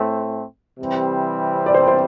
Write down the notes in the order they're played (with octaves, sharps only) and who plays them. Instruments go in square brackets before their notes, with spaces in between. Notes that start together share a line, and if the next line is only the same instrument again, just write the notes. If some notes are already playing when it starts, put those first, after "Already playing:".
Already playing: [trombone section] A2 A3 C4
C3 E3 G3 C4
[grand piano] D5
C5
C5